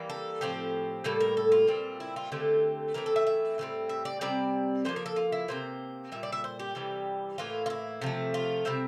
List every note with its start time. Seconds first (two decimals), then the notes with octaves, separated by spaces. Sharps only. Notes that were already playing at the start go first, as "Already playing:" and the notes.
Already playing: E3 G3 A#3
0.10 A4
0.41 A2 F3 C4 G4
1.04 A2 G3 A#3 A4
1.21 A#4
1.37 A4
1.52 F4
1.68 A#2 G3 C4
2.00 E4
2.16 F4
2.32 D3 A3 C4 G4
2.94 E3 A3 C4 A#4
3.06 A4
3.16 E5
3.27 E5
3.58 A2 E3 G3 C4
3.89 E5
4.05 D5
4.21 C3 G3 C4 D5
4.85 D3 F3 A#3 C5
4.96 A#4
5.06 A4
5.16 F4
5.32 E4
5.48 C3 F3 A#3 C5
6.12 A#2 G3 E5
6.23 D5
6.33 E5
6.44 C5
6.59 G4
6.75 C3 E3 G3
7.38 A2 E3 A#3 F4
7.66 F4
7.70 E4
8.02 C3 F3 A3
8.34 F4
8.65 C3 G3 C4 E5